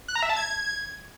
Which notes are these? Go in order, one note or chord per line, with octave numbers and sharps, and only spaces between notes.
F#6
A#5
E5
A5
G#6